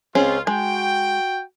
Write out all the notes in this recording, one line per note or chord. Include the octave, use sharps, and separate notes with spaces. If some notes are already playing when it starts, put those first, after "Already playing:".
C#2 C4 C#4 F4 G#4
G#3 F#4 G5